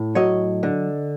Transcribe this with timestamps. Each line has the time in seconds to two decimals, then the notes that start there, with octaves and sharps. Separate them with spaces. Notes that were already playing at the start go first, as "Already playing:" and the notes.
Already playing: A2
0.15 F#3 C#5 D#5
0.63 D3